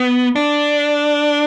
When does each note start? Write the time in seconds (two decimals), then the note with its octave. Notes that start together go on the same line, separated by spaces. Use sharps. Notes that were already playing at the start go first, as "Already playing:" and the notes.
Already playing: B3
0.36 D4